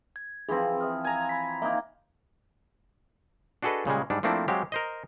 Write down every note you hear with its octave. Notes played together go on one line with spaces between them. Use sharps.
G#6
E3 F3 C4 G#4 B4
E5 D#6 F6
G#5 A#5
B5 B6
A#3 D#4 E5
D4 F#4 G#4 A4 B4 D#5
A#2 C#3 G3 G#3
G#2 G3 D4
F3 A3 A#3 C4 D4 E4
F#3 G#3 C4 G4 F5
A#4 C5 D#5